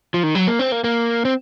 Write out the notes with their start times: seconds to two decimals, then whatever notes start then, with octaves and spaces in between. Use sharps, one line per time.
0.14 F3
0.23 D#3
0.35 F#3
0.47 A#3
0.59 C4
0.72 A#3
0.84 A#3
1.25 C4